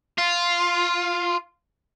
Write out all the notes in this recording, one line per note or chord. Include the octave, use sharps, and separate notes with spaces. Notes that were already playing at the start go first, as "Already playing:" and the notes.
F4